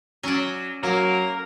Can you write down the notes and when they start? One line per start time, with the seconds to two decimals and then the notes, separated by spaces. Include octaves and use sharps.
0.23 F#3 C#4 D5
0.83 F#3 A#3 A#4